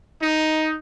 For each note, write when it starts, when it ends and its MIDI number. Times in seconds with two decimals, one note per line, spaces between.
0.21 0.75 63